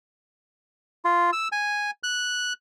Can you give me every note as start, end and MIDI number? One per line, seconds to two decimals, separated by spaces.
1.05 1.30 65
1.33 1.48 88
1.52 1.91 80
2.03 2.53 90